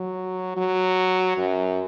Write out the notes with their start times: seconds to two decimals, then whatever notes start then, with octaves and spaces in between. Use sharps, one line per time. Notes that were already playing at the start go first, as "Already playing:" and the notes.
Already playing: F#3
0.57 F#3
1.38 F#2